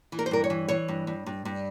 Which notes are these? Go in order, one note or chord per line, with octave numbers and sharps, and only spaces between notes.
E3
A#4
C5
G2 A#4
C#5
E3
E3 C#5
G2
G2
G2
G2